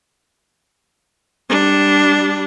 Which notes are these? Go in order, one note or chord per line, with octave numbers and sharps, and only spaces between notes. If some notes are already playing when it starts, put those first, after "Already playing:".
G3 D4